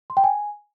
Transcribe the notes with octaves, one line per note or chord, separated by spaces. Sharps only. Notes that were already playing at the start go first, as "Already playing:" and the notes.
C6
G5
G#5